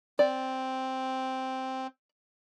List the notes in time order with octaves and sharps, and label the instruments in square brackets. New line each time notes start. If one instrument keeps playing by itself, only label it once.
[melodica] C4 [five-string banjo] D5